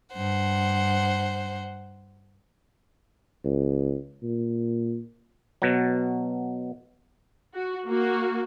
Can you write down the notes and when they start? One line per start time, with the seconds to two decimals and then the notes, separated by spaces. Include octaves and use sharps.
0.13 G2 C5 F#5
3.44 C#2
4.22 A#2
5.62 B2 F#3
7.54 F#4
7.86 A#3 F#4